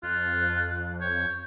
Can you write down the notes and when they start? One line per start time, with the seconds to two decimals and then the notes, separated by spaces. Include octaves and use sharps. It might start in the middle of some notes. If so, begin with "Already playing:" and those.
0.03 F2 F4 F#6
1.00 C#5 G6